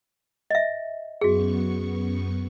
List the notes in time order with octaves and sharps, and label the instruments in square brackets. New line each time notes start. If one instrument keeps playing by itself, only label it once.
[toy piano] D#5 E5
[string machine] F#2 B3 C#6 [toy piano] F#4 G#4